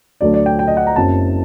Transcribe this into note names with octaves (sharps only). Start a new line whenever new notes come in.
D2 D3 F#3 A3 D5
D5
G5
G5
D#5
F#5
A#5
F#1 F#2 F#3 C4 A5